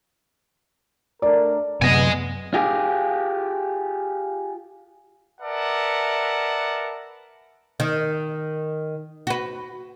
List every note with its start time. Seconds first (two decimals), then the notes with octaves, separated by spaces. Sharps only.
1.22 A3 D4 A#4 D5
1.82 F#2 C3 B3 D#5 G#5
2.54 F4 G4 G#4
5.41 A#4 B4 D5 E5 F#5 A5
7.80 D#3
9.27 F#4 B4